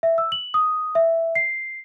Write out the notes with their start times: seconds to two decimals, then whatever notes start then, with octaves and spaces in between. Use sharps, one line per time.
0.03 E5
0.18 E6
0.32 F#7
0.54 D#6
0.95 E5
1.35 C7